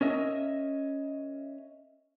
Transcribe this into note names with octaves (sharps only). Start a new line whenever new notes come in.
C#4 A#4 D#5 E5